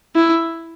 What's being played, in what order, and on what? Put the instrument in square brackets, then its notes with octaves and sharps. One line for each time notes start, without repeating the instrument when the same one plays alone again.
[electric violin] E4